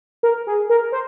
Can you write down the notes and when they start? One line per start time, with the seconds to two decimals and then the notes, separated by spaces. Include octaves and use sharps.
0.23 A#4
0.47 G#4
0.70 A#4
0.92 C5